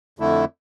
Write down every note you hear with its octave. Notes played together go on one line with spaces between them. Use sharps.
F2 D3 A3 E4